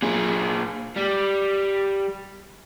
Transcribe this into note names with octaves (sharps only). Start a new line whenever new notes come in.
A#2 G#4
G3